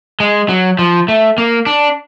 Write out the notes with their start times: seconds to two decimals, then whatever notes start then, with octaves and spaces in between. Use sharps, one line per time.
0.20 G#3
0.49 F#3
0.79 F3
1.08 A3
1.38 A#3
1.67 D4